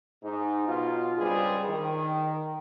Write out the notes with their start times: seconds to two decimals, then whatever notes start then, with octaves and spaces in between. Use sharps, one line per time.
0.23 G#2 D#4
0.68 B1 B2 F4
1.19 C#2 G2 G3 G#4 C5
1.69 D#3